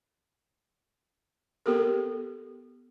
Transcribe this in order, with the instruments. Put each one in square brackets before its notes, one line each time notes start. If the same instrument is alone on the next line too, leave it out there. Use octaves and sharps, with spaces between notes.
[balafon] B3 G4 A4 A#4